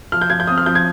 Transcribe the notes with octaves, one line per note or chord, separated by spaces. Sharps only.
F3 F6
G6
F3 G#6
G6
C4 D#6
F6
F3 G6
G#6